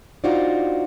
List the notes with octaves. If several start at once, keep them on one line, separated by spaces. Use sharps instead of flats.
D4 D#4 F4 F#4 C5 D5